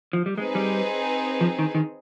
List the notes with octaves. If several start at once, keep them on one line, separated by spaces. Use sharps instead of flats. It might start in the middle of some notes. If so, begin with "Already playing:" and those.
F3
G3
G#3 C4 D#4 G#4 B4
G3
F3
D#3
D#3